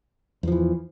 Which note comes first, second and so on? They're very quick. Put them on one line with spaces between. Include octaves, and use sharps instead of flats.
E2 F3 E3